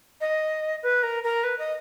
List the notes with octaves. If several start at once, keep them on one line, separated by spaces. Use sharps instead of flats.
D#5
B4
A#4
A#4
B4
D#5